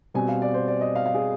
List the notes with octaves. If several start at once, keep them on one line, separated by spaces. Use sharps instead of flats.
B2 G3 C4 G#5
F5
D5
C5
D5
D#5
F5
F5
G#4